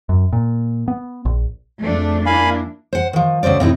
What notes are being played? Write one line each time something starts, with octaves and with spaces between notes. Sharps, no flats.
F#2
A#2
B3
A#1
F2 F3 G#3 A3 D4
A#3 D4 E4 F5 G#5 B5
C5 F#5
D#3 F3
D2 C#3 F3 C5 D5
A2 C3 D#4 E4